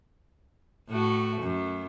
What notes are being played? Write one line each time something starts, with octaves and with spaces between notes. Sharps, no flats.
A2 A3 F#4
F#2